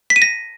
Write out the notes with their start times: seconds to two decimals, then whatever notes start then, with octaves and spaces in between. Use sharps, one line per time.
0.10 B6
0.16 D#7
0.22 A#6